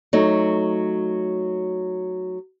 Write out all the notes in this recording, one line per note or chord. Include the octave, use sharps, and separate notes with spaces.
F#3 A3 D#4